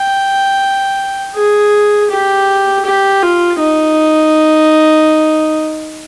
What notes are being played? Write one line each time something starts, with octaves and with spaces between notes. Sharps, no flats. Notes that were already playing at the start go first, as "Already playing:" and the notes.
Already playing: G5
G#4
G4
G4
F4
D#4